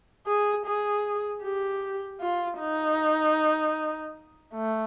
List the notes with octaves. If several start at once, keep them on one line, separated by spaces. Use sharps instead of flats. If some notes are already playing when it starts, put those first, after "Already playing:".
G#4
G#4
G4
F4
D#4
A3